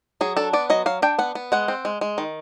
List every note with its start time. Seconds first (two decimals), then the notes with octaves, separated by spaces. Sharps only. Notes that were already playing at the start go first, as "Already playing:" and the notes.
0.21 F#3 G#4
0.37 D4 A4
0.53 B3 D5
0.70 F#3 D#5
0.86 F#3 F5
1.02 D4 G5
1.19 B3 F#5
1.35 B3
1.52 G#3 F#5
1.68 C4
1.85 G#3
2.01 G#3
2.18 D#3